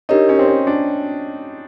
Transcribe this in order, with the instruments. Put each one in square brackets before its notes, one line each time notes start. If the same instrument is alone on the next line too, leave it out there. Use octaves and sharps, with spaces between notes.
[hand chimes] D4 G4 A#4 C#5 [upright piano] D#4
[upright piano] C#4
C4
C#4
D4